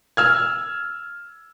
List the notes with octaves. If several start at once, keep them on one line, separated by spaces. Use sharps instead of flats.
E6 F6 G#6